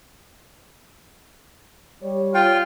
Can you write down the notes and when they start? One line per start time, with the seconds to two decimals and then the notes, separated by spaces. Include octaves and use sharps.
2.02 G3 C#5
2.34 F4 G5